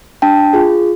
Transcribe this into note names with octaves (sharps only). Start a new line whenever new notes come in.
D4 G5 A5
F4 G#4